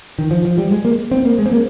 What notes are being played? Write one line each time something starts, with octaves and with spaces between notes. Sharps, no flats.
D#3
F3
F3
G3
G#3
A#3
C4
A#3
G#3
C4
A#3